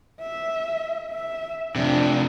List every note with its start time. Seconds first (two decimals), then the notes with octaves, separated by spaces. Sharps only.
0.21 E5
1.11 E5
1.76 F2 C3 D4